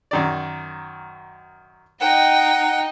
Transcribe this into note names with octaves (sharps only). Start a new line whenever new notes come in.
F#2 D#3 D5
D#4 D#5 F#5 G5